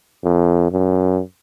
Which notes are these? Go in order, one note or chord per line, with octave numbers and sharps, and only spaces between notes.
F2
F#2